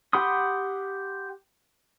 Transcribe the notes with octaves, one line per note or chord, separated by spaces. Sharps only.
G4 F#5 B5 C6 D#6